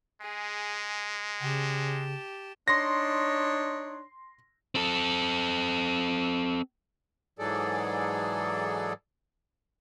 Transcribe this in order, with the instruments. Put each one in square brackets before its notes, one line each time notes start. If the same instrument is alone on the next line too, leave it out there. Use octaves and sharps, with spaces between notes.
[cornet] G#3 [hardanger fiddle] G#4
[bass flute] C#3 [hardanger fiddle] G4 A5
[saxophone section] D4 D#4 C#5 [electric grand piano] C6 A#6
[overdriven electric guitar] C4 A4
[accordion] G#2 E3 F#3 G#4 A4 D5